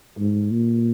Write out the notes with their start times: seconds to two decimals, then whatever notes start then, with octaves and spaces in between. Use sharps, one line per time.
0.19 G#2
0.51 A#2